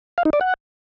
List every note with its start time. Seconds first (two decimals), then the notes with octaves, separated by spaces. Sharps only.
0.18 F5
0.25 D#4
0.33 D5
0.41 F#5